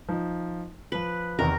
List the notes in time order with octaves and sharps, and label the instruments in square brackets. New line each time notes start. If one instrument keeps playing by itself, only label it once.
[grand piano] F3 D#4
[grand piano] F3 F#7 [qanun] B4
[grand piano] E2 C3 D#3 [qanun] A#4